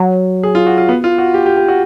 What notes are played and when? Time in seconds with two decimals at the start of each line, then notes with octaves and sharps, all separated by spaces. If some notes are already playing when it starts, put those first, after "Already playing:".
Already playing: F#3
0.43 G#4
0.55 F4
0.67 F#4
0.78 F4
0.89 B3
1.04 F4
1.18 F#4
1.34 G4
1.46 G4
1.57 G4
1.68 F#4